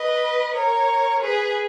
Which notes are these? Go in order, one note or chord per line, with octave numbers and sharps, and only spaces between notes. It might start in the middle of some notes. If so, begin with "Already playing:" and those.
Already playing: B4 D#5
A#4 C#5
G#4 B4